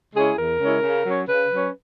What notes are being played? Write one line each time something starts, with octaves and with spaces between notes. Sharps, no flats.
C#3 G#3 C#4 E4 G#4
E2 A#4
C#3 G#3 C#4 E4
C#3
F#3 C#4
C#3 B4
F#3 C#4